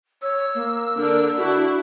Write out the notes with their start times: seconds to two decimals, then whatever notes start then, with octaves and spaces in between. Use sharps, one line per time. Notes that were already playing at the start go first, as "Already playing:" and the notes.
0.22 C#5 E6
0.55 A#3
0.99 D3 D4 A#4
1.37 D4 E4 F#4